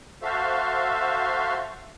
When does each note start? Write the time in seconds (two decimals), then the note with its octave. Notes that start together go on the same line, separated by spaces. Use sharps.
0.23 F#4 A4 C5 E5 F5